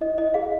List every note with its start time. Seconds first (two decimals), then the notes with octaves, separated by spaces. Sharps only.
0.01 E4 D#5
0.18 E4 D#5
0.34 G#4 F5